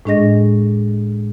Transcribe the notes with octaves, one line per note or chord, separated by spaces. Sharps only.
A2 G#3 D4 G#4 D#5 A#6